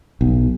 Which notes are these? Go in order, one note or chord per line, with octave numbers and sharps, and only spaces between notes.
B1